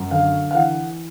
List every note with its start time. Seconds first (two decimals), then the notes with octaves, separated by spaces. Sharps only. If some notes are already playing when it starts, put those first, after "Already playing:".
Already playing: F#2
0.11 D3 F5
0.51 F5
0.54 E3 F#5